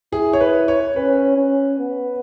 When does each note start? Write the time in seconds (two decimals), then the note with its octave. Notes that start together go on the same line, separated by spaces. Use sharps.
0.13 E4 G#4
0.33 C#5
0.41 B4
0.68 C#5
0.96 C#4 B4
1.37 C#4
1.79 B3